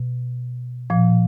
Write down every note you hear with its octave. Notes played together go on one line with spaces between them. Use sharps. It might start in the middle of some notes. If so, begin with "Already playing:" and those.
Already playing: B2
A#2 F3